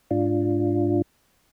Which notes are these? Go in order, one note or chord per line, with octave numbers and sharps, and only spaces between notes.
G#2 D4 F4